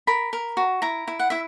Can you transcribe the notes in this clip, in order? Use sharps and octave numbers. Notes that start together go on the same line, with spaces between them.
A#4 B5
A#4
F#4
E4 A#5
E4
F#5
E4 E5